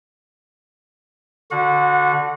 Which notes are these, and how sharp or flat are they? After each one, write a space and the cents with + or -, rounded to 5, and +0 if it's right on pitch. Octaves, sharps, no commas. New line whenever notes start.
D3 +0 F#4 -15 F#5 -35